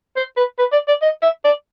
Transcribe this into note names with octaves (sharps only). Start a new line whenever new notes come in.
C5
B4
B4
D5
D5
D#5
E5
D5